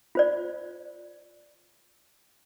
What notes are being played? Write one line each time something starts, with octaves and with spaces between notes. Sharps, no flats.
F4 C5 D5